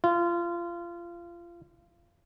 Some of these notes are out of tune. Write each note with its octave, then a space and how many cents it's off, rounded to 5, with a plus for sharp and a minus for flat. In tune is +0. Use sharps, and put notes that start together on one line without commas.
F4 -25